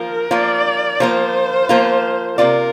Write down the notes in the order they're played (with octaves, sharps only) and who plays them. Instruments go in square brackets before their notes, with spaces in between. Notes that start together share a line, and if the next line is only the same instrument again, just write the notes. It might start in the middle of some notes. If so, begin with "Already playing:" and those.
Already playing: [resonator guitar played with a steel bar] F3 A#3 F4 [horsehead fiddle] A#4
[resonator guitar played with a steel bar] F3 A#3 F4 [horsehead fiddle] D5
[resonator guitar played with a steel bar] F3 A#3 F4 [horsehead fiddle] C5
[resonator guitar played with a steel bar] F3 A#3 F4
[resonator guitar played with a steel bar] C3 A#3 F4 D5 [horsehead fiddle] A#4